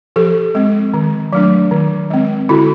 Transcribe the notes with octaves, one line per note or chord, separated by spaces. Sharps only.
F3 G4 A4
G#3 C4
D#3
F#3 A3 D4
D#3
G#3 C4
D3 E4 F#4